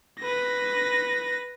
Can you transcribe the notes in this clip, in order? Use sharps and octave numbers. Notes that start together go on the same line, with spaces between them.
B4 A#6